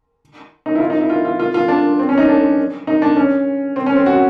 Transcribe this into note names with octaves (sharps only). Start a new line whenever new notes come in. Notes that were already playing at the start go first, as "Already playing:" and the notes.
D#4
E4
F4
D#4
E4
F4
F4
F4
F4
D4
C4
C#4
D#4
D4
D#4
D4
C#4
C4
C#4
C4
F#4